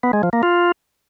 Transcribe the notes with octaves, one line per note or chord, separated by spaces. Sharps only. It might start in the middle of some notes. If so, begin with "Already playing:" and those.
B3
G#3
F3
A#3
F4